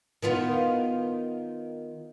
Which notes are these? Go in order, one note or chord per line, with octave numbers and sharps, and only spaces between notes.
D#3 B3 F4